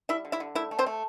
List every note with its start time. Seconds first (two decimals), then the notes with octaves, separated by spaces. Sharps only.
0.09 G3 E4 E5
0.25 D3
0.32 E4 E5
0.40 D3
0.55 A3 E4 E5
0.71 A3
0.79 C4 C5
0.86 A3